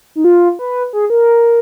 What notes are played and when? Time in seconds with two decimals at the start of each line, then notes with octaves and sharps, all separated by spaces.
0.15 D#4
0.24 F4
0.59 B4
0.93 G#4
1.10 A#4